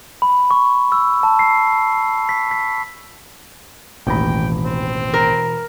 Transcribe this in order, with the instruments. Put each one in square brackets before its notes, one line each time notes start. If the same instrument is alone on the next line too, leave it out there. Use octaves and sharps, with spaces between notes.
[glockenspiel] B5
C#6
E6
A5
C7
B6
B6
[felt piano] E1 B5 [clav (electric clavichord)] A1 D#2 A#5 [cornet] G5
[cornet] C4
[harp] A#4